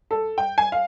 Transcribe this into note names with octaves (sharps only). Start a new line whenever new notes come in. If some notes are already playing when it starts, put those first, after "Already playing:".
A4
G5
G#5
F5